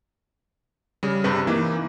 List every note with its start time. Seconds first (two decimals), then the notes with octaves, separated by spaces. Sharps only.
1.03 C#3 G3
1.24 G2 C3 B4
1.47 E3 A#3 D#4